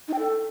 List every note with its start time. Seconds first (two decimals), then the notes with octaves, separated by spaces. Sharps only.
0.08 D#4
0.13 G5
0.19 A4